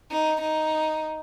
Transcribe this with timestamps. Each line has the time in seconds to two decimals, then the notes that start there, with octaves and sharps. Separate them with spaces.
0.12 D#4
0.41 D#4